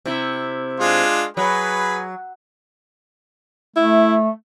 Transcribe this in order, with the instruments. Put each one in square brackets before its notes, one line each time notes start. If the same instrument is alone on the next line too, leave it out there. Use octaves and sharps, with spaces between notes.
[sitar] C3 E4
[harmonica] G#3 D4 F4
[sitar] F#3 [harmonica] G#4 B4 B5
[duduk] A3 [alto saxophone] E4